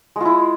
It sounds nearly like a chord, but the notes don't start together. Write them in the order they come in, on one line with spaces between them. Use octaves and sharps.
G#3 F4 E4